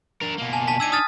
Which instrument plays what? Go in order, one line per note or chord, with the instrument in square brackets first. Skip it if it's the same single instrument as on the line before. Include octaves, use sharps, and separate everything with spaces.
[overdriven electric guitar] D4 A#4
B2 A#3
[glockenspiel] G#5 A5
A5 B6
[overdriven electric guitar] D4 D#4 [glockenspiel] E6 G#6 D#7
[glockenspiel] D#6 F6 A6